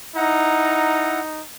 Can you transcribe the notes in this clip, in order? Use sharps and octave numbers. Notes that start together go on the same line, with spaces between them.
D#4 E4 F#5 A#5